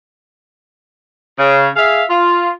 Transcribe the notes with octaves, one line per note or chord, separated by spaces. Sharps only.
C#3
G#4 E5 F5
F4